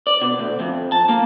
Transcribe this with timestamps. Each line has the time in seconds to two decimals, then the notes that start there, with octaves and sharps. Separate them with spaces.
0.07 D5
0.22 B2
0.39 D2
0.60 F2
0.92 A5
1.09 A#3